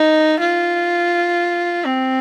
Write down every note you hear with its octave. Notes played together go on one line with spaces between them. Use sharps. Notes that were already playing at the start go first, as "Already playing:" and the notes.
Already playing: D#4
F4
C4